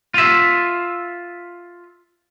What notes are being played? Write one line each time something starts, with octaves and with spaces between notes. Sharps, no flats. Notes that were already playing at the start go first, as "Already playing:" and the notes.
F4 E5